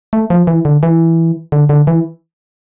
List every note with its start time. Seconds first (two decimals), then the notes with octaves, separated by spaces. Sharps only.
0.13 A3
0.30 F3
0.47 E3
0.65 D3
0.83 E3
1.52 D3
1.69 D3
1.87 E3